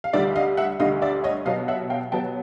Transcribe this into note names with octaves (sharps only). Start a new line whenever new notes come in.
F5
D2 D3 G3 D5 E5
D#5 F5
E5 F#5
D2 D3 G3 D#5 F5
D5 E5
C#5 D#5
B2 F#3 B3 D#5 F5
E5 F#5
F5 G5
B2 F#3 B3 G5 A5